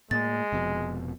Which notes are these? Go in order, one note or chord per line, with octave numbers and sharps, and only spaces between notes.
A2 G#3 A#3 A6
F1 F2 B2